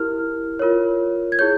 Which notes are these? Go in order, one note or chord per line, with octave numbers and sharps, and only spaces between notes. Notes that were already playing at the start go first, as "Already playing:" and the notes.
Already playing: E4 G4 A#4 F6
F4 A#4 C#5
G#6
E4 G#4 C#5 G6